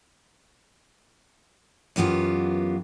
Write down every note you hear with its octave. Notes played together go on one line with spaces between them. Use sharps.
F#2 E3 B3 F4 G4